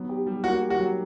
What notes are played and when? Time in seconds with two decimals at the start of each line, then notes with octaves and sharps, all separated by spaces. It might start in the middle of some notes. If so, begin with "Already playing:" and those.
Already playing: F#3 B3
0.09 G4
0.26 G3
0.44 A#3 F#4
0.61 G4
0.70 F#4
0.79 F#3